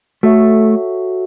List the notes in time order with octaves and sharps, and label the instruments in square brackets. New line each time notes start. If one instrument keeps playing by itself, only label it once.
[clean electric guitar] A3 [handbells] F#4 A4 C#5 E5